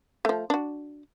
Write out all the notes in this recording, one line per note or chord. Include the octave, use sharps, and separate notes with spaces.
F3 A3
D4 F#4